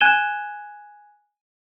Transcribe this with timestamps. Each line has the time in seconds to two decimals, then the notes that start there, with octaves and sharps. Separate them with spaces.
0.01 G#5 F#6 G#6 D#7 E7 G7